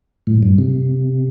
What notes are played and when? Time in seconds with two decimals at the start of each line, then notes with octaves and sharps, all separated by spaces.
0.27 A2
0.43 G2
0.58 C3